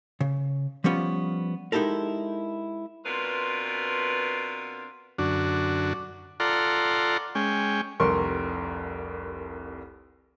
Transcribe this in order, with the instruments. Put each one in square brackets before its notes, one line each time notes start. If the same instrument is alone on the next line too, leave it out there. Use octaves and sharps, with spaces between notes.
[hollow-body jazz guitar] C#3
F3 G3 B3 C#4 F4
G#3 D#4 E4 G4 A4 A#4
[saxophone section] B2 C4 D4 F4 A#4 B4
[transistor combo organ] F#2 D3 D4 F#4
F4 A4 D5 F#5 A#5 C6
G#3 C#4 G5
[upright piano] F1 C2 A#4 C6 C#6